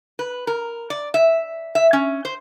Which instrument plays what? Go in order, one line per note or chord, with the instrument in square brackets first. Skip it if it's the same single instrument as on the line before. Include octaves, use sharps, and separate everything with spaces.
[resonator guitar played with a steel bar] B4
A#4
D5
E5
E5
C#4
C5